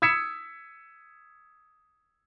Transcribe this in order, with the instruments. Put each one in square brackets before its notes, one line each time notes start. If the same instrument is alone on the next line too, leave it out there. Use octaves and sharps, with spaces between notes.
[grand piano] D#6 E6 G#6 B6 C#7 E7